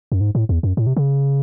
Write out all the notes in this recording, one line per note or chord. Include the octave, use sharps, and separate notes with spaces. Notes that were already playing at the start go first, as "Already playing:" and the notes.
F#2
G#2
A2
E2
F#2
A2
C3
C#3